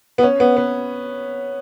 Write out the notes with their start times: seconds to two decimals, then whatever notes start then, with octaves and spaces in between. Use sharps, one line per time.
0.18 B3
0.23 C#4
0.40 B3
0.57 B3